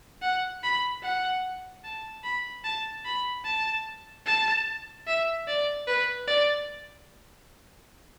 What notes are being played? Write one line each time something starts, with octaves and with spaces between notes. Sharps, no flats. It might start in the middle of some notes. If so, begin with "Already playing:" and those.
F#5
B5
F#5
A5
B5
A5
B5
A5
A5
E5
D5
B4
D5